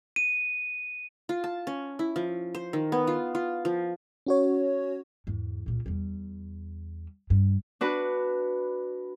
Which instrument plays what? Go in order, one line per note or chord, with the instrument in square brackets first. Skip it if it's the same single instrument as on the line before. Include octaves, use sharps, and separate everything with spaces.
[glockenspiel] D#7
[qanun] F4
A5
C#4
E4
F3
C5
D#3
B3
F4
F4
F3
[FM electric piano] C#4 F#4 C#5
[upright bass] E2 G#2
C#2 A#2
E2 G3
G2
[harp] D4 F#4 B4